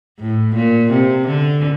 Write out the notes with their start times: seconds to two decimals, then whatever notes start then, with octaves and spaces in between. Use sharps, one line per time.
0.19 A2
0.54 A#2
0.90 C3
1.26 D3